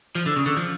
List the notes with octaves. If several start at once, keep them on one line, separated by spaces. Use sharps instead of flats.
F3
D3
C#3
D3
F3